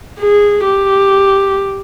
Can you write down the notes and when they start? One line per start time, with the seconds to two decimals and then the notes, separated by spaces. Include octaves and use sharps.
0.20 G#4
0.65 G4